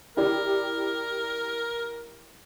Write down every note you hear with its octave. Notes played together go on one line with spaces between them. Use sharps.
E4 G4 A#4 D5